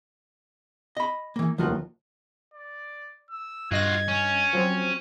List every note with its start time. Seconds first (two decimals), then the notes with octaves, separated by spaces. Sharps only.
0.97 D#5 B5
1.36 E3 A#3
1.58 F1 D#2 F3 F4 F#4
2.54 D5
3.31 E6
3.71 G2 F4 F#4 D#5 G#6 A#6
4.08 C#4
4.53 F3 F#3 C4